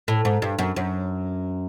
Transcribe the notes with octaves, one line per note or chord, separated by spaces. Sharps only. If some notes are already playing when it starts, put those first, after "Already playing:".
A2
G#2
G2
F#2
F#2